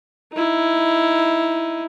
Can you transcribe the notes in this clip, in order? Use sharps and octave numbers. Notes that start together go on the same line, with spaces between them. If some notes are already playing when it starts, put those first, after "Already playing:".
D#4 E4